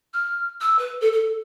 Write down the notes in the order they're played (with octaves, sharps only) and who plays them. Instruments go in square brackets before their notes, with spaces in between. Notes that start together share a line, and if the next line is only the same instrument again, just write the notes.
[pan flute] F6
E6
B4
A4
A4